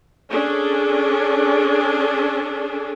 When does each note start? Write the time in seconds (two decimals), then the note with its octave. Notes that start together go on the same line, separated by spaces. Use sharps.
0.31 C#4 D4 G#4 A4